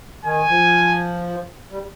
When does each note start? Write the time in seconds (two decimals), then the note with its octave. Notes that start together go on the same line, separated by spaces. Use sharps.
0.25 D#3 G#5
0.50 F3
1.72 G3